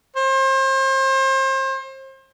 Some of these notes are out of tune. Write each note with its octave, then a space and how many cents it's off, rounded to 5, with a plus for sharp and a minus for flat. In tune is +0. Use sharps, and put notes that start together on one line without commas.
C5 +35